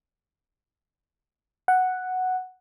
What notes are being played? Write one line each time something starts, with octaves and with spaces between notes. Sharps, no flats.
F#5